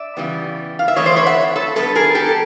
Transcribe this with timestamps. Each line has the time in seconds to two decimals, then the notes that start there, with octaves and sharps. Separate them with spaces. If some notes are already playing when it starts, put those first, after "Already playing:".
Already playing: D5 E5
0.17 C#3 E3 G3 B3
0.79 F5
0.88 E5
0.96 E3 A3 C4 C#5 D#5
1.05 C5 D5
1.16 B4 C#5
1.26 E5 F#5
1.56 A4 B4
1.75 D3 G3 B3 A4 B4
1.95 G#4 A#4
2.15 G4 A4
2.29 A4